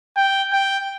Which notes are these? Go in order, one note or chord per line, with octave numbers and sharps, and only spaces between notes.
G5
G5